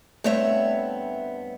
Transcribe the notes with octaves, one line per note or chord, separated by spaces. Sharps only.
G2 A3 B3 C4 C#5 E5